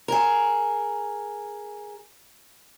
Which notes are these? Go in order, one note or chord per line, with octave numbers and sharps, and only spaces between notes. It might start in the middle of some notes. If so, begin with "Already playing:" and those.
G#4 A#4